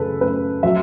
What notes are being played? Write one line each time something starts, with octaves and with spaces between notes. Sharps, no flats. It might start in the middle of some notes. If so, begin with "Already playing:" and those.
Already playing: F#2 C#3 A4 B4
F#2 B4
F#3 E5